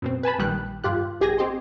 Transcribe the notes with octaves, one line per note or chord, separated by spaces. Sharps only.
F#2 B2 C4
B4 G#5 A5 B5
A#1 A#2 D#3 G3 G5 F#6
G2 F4 G4 F#6
A1 G4 G#4 G#5 G#6 A#6
C4 G4 D#5 C6